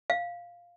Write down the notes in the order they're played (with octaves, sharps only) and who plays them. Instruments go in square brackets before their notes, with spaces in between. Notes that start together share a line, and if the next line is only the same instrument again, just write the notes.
[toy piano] F5